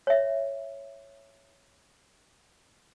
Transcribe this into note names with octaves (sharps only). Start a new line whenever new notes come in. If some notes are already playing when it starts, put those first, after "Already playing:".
C#5 E5